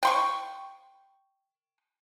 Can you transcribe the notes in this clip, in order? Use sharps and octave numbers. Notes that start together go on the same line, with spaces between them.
G5 C6 C#6